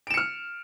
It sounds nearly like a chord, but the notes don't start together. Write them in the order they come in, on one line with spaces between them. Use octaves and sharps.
D7 E7 C#7 F6